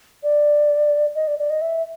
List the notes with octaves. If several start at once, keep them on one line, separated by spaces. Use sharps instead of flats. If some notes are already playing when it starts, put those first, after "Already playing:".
D5
D#5
D5
D5
D#5
E5